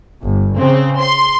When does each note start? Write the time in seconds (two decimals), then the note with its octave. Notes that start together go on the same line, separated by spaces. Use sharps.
0.24 G1
0.57 C#3 C4
1.00 C6